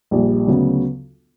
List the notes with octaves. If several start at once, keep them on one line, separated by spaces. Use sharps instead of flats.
A#1 A#2 G3
D2 C#3 F#3 B3